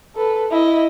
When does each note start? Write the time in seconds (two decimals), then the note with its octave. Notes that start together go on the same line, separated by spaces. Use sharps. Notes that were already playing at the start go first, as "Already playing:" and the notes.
0.16 A4 B4
0.51 E4 D#5